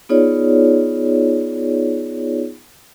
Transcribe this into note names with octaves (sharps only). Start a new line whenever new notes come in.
B3 D#4 F4 G#4 C#5 D5